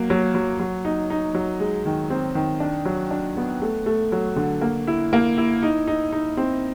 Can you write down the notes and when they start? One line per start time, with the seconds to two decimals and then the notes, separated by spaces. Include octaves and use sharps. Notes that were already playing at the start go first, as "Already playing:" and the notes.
Already playing: F#3 A#3
0.10 F#3
0.35 F#3
0.60 F#3
0.85 D#4
1.10 D#4
1.35 F#3
1.60 G#3
1.86 D#3
2.10 C4
2.35 D#3
2.60 D4
2.85 F#3
3.11 D4
3.37 B3
3.62 A3
3.86 A3
4.12 F#3
4.36 D3
4.61 A#3
4.87 E4
5.13 A#3
5.38 E4
5.63 D#4
5.87 D#4
6.12 D#4
6.37 C4